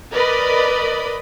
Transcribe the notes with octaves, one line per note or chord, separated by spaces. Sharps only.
A#4 B4 D5 D#5 B5